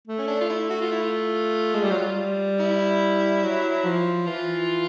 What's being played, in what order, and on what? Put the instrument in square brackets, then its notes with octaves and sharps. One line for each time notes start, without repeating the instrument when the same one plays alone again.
[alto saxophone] A3
[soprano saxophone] C#4
D4
F4
E4
F#4
F4
E4
F4
[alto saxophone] G#3
G3
F#3
G3
[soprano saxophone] E4
[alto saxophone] F#3
F3
[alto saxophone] E3 [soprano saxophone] F4